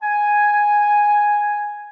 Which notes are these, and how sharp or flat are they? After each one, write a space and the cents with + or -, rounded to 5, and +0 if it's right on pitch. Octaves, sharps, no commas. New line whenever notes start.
G#5 +0